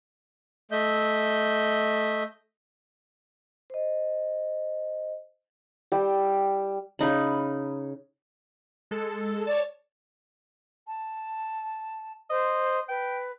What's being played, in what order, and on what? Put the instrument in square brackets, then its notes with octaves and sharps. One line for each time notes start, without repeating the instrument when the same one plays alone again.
[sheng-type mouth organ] A3 D#5 E5 G6
[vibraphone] C5 D#5
[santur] G3 G5 E6
[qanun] C#3 D#4 B5
[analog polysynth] G#3 A4
[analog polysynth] C#5 A5 [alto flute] D5
[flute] A5
[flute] C5 [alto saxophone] D#5
[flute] B4 [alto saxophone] G5